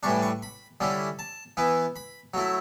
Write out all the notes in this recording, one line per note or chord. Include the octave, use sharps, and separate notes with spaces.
A2 E3 G3 D4 C#6
C#6
B5
D3 G3 C#4 E4
A5
E3 B3 E4
B5
F#3 A3 E4